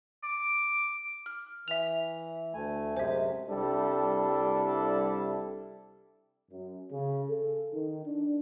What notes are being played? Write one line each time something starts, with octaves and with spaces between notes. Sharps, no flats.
D6
F6
E3 E5 F7
D2 A3 G#5
F#2 C3 G#3 C5 E5
C2 G3 D4 E4 A4
F#2
C#3
A4
D#3
D4